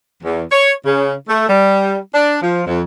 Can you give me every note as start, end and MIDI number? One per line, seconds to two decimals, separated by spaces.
0.23 0.44 40
0.52 0.72 73
0.85 1.13 49
1.29 1.47 57
1.49 1.98 55
2.14 2.38 62
2.42 2.63 53
2.66 2.83 41